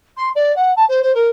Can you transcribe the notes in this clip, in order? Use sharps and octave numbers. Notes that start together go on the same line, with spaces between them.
C6
D5
F#5
A5
C5
C5
A#4